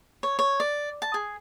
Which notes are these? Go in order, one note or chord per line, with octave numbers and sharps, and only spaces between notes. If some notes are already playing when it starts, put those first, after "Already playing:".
C#5
C#5
D5
A5
G#4